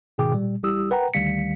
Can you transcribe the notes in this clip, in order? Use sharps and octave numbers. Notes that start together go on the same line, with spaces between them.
G#2 B2 D#3 G#4 G5 D6
A#2 G3
A1 G3 E4 G4 D#6 E6
A#4 B4 F#5 G5 A#5
D2 D#3 G3 F5 B6 C#7